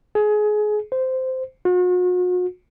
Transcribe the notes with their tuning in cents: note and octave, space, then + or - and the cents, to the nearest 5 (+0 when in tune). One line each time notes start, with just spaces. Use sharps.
G#4 +25
C5 -10
F#4 -40